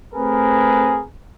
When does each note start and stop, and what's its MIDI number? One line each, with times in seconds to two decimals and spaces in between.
0.15 1.01 57
0.15 1.01 60
0.15 1.01 68
0.15 1.01 70
0.15 1.01 71